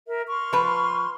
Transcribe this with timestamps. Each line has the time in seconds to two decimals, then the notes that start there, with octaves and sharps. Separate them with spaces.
0.06 A#4 E5
0.29 C6 C#6 F6
0.53 F3 B4